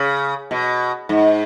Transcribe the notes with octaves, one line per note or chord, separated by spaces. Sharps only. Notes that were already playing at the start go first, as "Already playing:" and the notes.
Already playing: C#3
B2
G#2